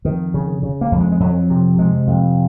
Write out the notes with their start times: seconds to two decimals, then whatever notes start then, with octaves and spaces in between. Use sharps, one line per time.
0.05 F2 D#3
0.34 C#3
0.63 C#3
0.81 A#3
0.92 F2
1.01 G#3
1.12 G#3
1.20 F2 F#3
1.50 C3
1.79 C3 G#3
2.07 F2